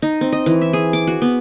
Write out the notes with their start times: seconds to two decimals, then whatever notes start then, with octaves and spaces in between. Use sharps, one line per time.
0.02 D#4
0.21 C4
0.32 D#5
0.46 E3
0.61 E5
0.73 G#4
0.93 D6
1.07 F#4
1.22 B3